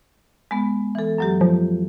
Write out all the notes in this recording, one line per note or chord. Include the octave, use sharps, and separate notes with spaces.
G#3 B3
E3 A4
F#2 F#3 G4
F3